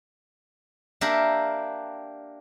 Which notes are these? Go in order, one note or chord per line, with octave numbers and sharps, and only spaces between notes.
A#3 D4 G4 A#4 E5